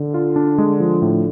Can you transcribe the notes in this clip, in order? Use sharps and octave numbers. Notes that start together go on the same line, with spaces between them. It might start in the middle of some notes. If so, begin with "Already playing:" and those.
Already playing: D3
F4
D4
G#3
F3
A2